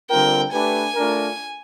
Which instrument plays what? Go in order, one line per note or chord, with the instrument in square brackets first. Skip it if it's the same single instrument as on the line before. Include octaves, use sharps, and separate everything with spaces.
[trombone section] D3 G3 C4 F4 A#4 [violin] G5
[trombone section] A3 D4 G4 B4 [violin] G#5
[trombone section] A3 D4 F4 A#4